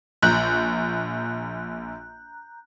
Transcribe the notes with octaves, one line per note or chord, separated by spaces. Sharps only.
A#1 A#5 F#6 G6